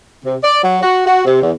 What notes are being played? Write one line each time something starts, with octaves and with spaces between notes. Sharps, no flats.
C3
D5
F#3
F#4
F#4
C3
E2